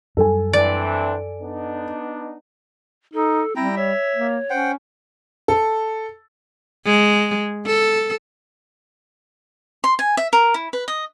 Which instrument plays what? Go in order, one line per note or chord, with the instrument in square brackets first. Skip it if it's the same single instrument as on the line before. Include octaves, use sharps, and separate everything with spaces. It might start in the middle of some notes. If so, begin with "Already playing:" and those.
[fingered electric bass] F#2 G3 [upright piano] A4 G#5
[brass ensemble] E3 C4 D4 [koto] D5
[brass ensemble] B3 D4 D#4
[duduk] D#4 [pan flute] A4
[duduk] G3 [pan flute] C4 [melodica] E4 G5 A#5
[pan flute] C#5 [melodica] E5
[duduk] A#3
[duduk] C#4 [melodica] C5 F#5 G5
[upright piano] A4
[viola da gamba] G#3
A4
[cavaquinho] C6
G#5
E5
A#4
E4
B4
D#5